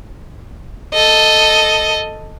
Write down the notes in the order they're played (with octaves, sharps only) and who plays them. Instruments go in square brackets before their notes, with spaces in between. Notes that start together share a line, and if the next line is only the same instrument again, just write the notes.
[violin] A4 D#5